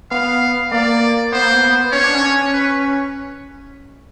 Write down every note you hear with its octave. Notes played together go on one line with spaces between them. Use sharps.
B3 F5
A#3 D5
B3 C5
A#3
B3
C#4 C#5
D4
C#4
B4